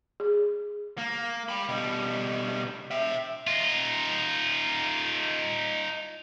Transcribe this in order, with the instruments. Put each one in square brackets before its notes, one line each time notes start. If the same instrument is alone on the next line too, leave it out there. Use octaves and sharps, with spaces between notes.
[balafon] G#4
[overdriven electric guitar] A#3
G5 B5
B2 G3
E5 G5
[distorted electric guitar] D#4 F4